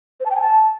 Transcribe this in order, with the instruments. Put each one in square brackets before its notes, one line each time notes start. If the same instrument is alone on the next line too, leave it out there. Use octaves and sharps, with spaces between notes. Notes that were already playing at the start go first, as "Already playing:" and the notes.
[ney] C5
A5
G5
G#5
A5